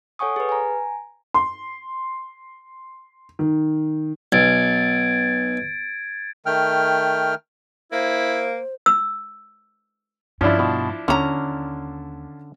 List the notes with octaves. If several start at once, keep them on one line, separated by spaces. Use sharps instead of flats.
A4 C#5 F#5 G#5 C#6 D#6
G#4 B4
G#5 A#5
C6
D#3
B1 G#6 A6 D7
D#3 A3 G5 F6
A#3 E4 C5
E6
G2 F3 C#4 D4 E4
B2
D#2 D3 C#4 A#5